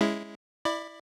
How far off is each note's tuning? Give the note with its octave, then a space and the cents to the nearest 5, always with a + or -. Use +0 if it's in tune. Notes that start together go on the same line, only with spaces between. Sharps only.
G#3 +0 C#4 +0 E4 +0
E4 +0 D5 +25 B5 +0